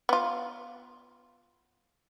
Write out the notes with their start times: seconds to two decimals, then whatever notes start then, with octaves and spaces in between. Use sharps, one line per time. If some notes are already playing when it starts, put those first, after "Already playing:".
0.09 B3 F4